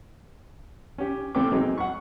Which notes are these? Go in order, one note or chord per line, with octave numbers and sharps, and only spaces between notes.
C#4 G4
E2 A3 C4 B4 G5 D6
F#3 G#3 C4 D#4
F#5 C#6